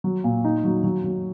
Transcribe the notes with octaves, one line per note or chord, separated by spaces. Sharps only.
F#3
A#2
D#4
F#3
F#3
F#3